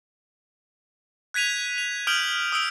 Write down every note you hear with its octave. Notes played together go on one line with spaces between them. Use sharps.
F#6 G#6 B6 D#7 F7
F7
D#6 F6 G6 D7 F7 F#7
D#6 E6 D7